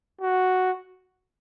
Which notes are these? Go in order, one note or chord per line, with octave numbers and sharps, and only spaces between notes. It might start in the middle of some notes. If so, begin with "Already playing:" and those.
F#4